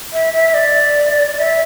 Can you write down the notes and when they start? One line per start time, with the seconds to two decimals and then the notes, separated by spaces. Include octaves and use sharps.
0.13 E5
0.34 E5
0.54 D5
1.37 E5